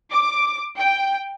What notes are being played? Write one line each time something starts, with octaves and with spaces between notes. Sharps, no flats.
D6
G5